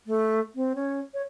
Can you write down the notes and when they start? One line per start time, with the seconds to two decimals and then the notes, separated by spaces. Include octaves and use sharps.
0.07 A3
0.55 C4
0.75 C#4
1.14 C#5